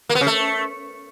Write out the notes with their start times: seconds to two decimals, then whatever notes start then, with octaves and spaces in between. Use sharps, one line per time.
0.09 A#3
0.15 B3
0.21 C#3
0.27 A3